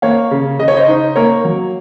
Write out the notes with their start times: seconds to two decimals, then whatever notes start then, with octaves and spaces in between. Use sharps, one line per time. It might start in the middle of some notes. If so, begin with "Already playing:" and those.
0.02 A#3 C#5 F5
0.31 C#3
0.59 C#3 D#5
0.68 C#5
0.77 C5 D#5
0.88 D#4
1.16 A#3 A#4 C#5
1.45 F#3